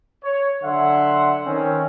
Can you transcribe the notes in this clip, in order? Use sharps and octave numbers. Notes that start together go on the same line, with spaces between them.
C#5
D3 F#3 E5 F#5 C6
D#3 C4 C#4